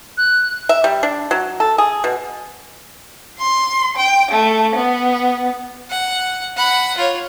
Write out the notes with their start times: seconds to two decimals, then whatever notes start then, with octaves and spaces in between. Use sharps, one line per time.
0.17 F#6
0.69 E5
0.84 G3
1.03 D4
1.31 F#3
1.60 A4
1.78 G#4
2.04 B2
3.38 C6
3.96 G5
4.31 A3
4.75 B3
5.90 F#5
6.57 F#5 B5
6.97 F4 C#5